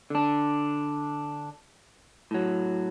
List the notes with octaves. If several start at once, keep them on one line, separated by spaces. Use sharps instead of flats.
D3 D4
A2 F#3